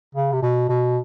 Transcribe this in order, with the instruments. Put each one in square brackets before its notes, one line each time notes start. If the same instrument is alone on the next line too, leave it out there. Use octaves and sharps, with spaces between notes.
[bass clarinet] C#3
C3
B2
B2